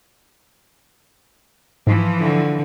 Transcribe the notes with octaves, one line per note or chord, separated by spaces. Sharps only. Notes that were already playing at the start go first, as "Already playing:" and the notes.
G#2 E3 F3
D3